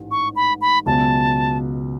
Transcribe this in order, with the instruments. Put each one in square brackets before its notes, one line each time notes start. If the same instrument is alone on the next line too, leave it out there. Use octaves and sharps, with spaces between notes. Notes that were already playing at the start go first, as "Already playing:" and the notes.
Already playing: [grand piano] A1 G#2
[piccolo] C#6
B5
B5
[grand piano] C#2 B2 F#3 B3 [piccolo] A5